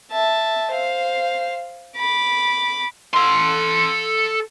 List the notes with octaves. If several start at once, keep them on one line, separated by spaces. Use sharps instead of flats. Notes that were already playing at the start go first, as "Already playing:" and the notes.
E5 A5
C5 F5
B5 D6
A4 C6